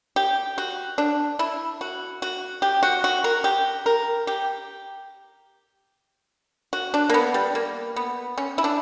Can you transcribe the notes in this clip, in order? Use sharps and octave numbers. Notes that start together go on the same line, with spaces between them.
G4
F#4
D4
E4
F#4
F#4
G4
F#4
F#4
A#4
G4
A#4
G4
F#4
D4
A#3
B3
G3
A#3
B3
C#4
E4
D4